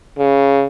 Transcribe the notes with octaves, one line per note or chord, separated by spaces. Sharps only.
C#3